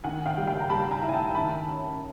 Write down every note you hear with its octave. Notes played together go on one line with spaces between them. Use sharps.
D#3 F#5 G#5
F5 G5
G3
F5 G5
A#5
G3 A5 B5
G#5 A#5
E4
G#5
G5 A5
D#3 A5 B5
C#4